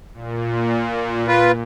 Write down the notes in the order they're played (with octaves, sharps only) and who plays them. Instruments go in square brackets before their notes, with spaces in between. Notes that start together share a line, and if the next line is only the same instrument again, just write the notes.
[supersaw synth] A#2
[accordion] F4 B4